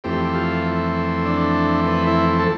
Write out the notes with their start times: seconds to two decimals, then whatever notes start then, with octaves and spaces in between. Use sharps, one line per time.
0.04 F2 E3 A3 C4 G4
0.25 G4
0.35 F4
1.25 D4
1.86 B4
2.07 E4
2.39 A4